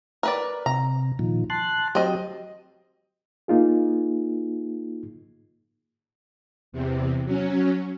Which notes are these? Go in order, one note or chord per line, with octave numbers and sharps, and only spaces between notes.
A#4 B4 D5
C3 A#5
A#2 D#3 F3
A5 C6 F#6
F#3 C4 G4 D#5
A#3 D#4 F4 G#4
E2 C3
F#3 C#4